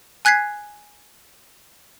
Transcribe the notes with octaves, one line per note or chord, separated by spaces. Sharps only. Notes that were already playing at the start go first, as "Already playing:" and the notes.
G#5 F#6 G#6 B6 C7